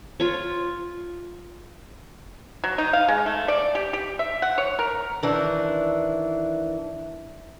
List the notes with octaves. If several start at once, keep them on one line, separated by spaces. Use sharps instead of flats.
F4 C#5
F#3
D#4
F5
G#3
A3
D5
G4
G4
E5
F#5
C#5
A#4
D#3 E3 D4